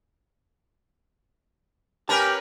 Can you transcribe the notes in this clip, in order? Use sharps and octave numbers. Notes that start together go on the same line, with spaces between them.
C#4 G4 A#4 B4 G#5 A5